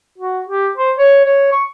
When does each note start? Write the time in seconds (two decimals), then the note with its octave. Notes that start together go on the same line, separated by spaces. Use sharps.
0.18 F#4
0.49 G4
0.77 C5
0.98 C#5
1.25 C#5
1.51 C#6